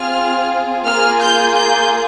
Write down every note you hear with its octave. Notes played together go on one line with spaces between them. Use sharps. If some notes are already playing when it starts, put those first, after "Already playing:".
Already playing: C4 F4 G#4 F6
A#3 F4 G#4 F6
G6
G6